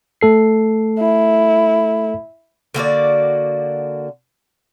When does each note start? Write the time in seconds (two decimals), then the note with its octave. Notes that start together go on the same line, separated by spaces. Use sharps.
0.21 A3 A4 C7
0.99 E4
2.74 D3 A#3 F#4 D5